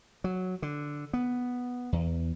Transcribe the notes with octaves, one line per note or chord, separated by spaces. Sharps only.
F#3
D3
B3
E2